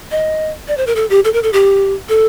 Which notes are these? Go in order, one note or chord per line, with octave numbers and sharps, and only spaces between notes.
D#5
D5
C5
A#4
A4
G4
A4
A#4
A4
G4
A4